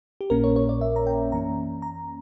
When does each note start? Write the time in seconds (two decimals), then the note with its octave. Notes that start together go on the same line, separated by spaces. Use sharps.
0.21 G4
0.30 A#1 A#2 A#3 C#4 A#4
0.44 C#5
0.56 C#5
0.69 D5
0.81 E5
0.96 A#5
1.07 G5
1.32 F#2 E3 A#3 C#4 A#5
1.82 A#5